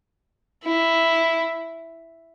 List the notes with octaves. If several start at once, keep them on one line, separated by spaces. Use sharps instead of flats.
E4